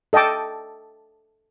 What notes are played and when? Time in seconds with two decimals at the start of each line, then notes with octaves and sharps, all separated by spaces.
0.13 A4 D#5 G5 A5 D6